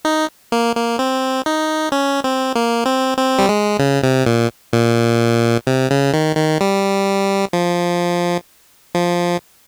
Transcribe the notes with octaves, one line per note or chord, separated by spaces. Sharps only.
D#4
A#3
A#3
C4
D#4
C#4
C4
A#3
C4
C4
G3
G#3
C#3
C3
A#2
A#2
C3
C#3
D#3
D#3
G3
F3
F3